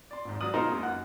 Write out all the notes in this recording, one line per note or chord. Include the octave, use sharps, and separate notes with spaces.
D5 C6
G#1 G#2
F#3 D5 D#6 F#7
B2 G#3 D#4 F4 A#4 C5
F#2 A#3
F#5